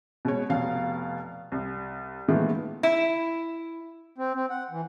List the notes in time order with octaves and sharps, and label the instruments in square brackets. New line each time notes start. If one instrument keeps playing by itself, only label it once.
[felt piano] B2 G#3 C#5
F1 B2 F5
C2
A#2 D#3 E3 G#3 A3 B3
[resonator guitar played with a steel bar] E4
[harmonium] C4
C4
F#5
E3